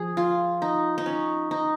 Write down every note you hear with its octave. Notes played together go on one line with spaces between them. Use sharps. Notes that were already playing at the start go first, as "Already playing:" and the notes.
Already playing: F3 G#4
F4
D#4
D#4
C#4
D#4